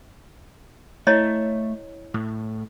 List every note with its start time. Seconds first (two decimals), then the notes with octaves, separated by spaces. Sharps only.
1.07 A3 E4 C#5 D#5
2.14 A2